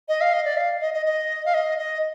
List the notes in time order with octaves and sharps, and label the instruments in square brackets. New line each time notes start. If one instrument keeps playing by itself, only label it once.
[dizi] D#5
F5
D#5
D5
F5
D#5
D#5
D#5
F5
D#5
D#5